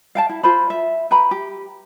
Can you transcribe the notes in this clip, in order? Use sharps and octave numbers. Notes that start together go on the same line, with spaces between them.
F5 G5 A5
E4
F4 C5 B5
E5
B4 G5 A#5 B5
G4